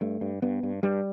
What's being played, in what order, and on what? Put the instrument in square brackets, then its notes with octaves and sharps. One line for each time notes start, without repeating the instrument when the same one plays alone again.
[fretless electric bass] G2 A3
G2
G2 B3
G2
G2 G3